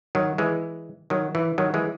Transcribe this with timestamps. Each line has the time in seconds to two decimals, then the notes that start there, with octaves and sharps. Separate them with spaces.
0.15 D#3 F#3
0.38 E3 G#3
1.10 D#3 F#3
1.35 E3
1.58 D#3 F#3
1.74 E3 G#3